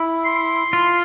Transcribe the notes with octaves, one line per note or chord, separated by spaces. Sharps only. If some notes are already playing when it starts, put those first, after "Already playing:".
Already playing: E4
C6
F4